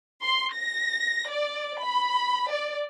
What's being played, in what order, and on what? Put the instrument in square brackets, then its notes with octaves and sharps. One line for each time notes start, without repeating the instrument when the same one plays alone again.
[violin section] C6
A#6
D5
B5
D5